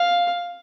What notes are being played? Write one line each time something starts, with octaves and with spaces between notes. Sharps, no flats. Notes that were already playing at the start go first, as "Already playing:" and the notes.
Already playing: F5